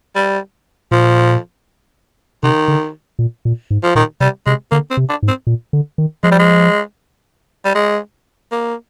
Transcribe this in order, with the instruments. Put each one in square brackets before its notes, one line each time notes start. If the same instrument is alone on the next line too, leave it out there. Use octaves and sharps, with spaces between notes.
[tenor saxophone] G3
[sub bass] A#2 [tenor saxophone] F3
[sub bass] C3 [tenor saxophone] D#3
[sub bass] D3
A#2
A#2
G#2
[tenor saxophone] F3
[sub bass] A#2 [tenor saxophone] D#3
[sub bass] C3 [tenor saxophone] G3
[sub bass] C3 [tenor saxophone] G#3
[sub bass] D3 [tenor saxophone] A#3
[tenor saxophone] C4
[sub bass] C3
[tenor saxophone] D4
[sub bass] G#2
[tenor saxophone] C4
[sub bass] A#2
D3
D#3
[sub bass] F3 [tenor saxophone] G#3
[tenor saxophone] G3
G#3
G3
G#3
A#3